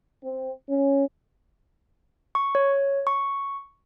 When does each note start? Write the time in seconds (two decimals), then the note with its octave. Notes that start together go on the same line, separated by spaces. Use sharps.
0.23 C4
0.69 C#4
2.35 C#6
2.55 C#5
3.07 C#6